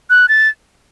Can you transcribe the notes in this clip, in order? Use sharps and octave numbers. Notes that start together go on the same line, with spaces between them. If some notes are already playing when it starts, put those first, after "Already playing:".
F#6
A6